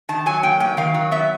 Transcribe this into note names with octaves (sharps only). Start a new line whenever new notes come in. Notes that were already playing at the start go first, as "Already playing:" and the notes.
D#3 A5
F#3 G#5
A#3 G5
A#3 G5
D#3 F5
F#3
B3 E5